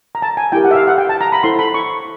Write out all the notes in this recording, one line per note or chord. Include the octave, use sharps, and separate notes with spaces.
A#5
A5
G#5
E4 G4 A#4 G5
F#5
E5
F5
F#5
G5
A5
A#5
B5
E4 A4 C5 C6
B5
C#6